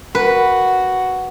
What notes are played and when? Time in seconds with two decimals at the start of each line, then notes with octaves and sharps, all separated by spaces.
0.15 F#4 B4